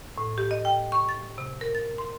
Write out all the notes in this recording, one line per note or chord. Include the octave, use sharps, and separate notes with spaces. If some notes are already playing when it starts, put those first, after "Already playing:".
A2
G4
D#5
G5
C#6
A6
C3
A#4
A6
C6